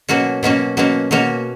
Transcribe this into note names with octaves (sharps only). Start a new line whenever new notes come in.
B2 F#3 A#3 C#4 F#4
B2 F#3 A#3 C#4 F#4
B2 F#3 A#3 C#4 F#4
B2 F#3 A#3 C#4 F#4